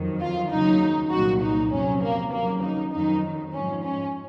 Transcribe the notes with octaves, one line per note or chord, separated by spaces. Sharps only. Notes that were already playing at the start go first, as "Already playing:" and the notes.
Already playing: F2 D#3 F#3
F4
D#2 C#3 F#3 D#4
C2 A#2 F#3 F#4
D#4
F2 C3 F#3 C#4
A#3
D#2 C#3 F#3 A#3
D#4
F2 D#3 F#3 D#4
G#2 F3 C#4
C#4